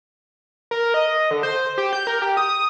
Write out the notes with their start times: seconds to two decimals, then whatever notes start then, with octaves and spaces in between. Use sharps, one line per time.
0.71 A#4
0.94 D#5
1.31 D3
1.43 C5
1.78 G4
1.93 G6
2.07 A#4
2.22 G4
2.37 D#6